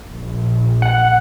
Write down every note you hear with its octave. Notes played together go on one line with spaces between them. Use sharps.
A#1
F#5